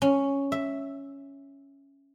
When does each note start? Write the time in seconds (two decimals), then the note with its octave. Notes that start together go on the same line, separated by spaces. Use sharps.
0.02 C#4
0.52 E5